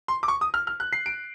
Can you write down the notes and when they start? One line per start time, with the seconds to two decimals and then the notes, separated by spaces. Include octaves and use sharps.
0.08 C6
0.23 D6
0.28 C#6
0.41 D#6
0.54 F6
0.67 F6
0.80 F#6
0.93 C7
1.06 D7